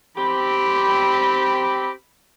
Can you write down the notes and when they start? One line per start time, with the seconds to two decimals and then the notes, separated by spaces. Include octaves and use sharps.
0.18 C4 G4 B5